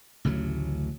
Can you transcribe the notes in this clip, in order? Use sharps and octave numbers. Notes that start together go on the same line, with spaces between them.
A1 D2 C#3 F#3